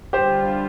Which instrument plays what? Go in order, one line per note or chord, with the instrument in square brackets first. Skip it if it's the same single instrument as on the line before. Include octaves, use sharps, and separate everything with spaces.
[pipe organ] D3 G3 F4 [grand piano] G4 C5